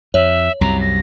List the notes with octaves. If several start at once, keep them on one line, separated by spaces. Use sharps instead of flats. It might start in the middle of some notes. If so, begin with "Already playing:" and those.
F2 C#5 E5
C2 F#2 C3 A#5
A#6